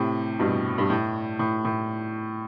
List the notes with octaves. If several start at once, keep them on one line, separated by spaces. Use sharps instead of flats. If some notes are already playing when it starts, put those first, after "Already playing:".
Already playing: A2 C3
G2 B2
G2
A2
A2
A2